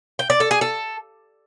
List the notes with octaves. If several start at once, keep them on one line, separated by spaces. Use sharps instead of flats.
G5
D5
A4
G#4
A4